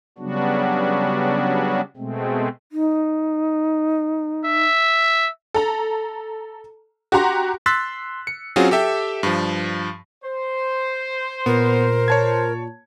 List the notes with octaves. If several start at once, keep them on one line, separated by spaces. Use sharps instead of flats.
C#3 F#3 G3 B3 D4 F#4
B2 G#3 A3 C4
D#4
E5
A4 A#5
F#4 G4 F#5 A#5 C6
C6 E6 F#6 A6 B6
C#7
F#3 C4 C#4 F4 F#4 G#4
G4 A4 E5 G5
G2 F3
C5
A#2 B3 A#4
C#5 A5 G#6